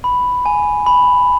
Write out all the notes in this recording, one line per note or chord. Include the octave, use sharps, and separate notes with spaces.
B5
G#5
B5